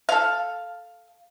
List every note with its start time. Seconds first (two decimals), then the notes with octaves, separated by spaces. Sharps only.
0.09 A4 F5